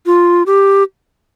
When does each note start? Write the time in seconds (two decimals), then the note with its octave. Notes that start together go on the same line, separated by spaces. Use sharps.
0.06 F4
0.46 G4